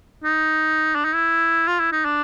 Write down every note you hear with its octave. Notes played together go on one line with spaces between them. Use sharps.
D#4
D4
D#4
E4
F4
E4
D#4
D4